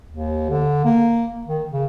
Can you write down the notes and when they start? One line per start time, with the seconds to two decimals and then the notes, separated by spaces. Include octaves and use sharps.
0.10 D#2
0.50 D3
0.85 A#3
1.47 D#3
1.72 C#3